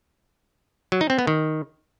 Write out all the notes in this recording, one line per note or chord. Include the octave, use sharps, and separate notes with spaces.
F#3
D#4
C4
B3
D#3